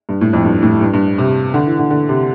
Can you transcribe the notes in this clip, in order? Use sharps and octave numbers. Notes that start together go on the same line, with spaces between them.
G2
A2
F2
G2
A2
G2
G2
C3
D3
E3
D3
D3
C3